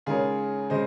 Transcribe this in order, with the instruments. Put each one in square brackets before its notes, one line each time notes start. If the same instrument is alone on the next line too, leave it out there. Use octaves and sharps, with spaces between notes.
[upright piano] C#3 G#3 D#4 A#4 C#5 [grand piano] F4 G#4
[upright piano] C#3 G#3 [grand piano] C5 D#5